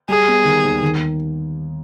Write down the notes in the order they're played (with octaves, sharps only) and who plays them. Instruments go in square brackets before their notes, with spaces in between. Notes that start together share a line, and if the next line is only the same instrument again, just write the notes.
[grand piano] G3 [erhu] G#4
[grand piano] B3
D#3
D#2
D#3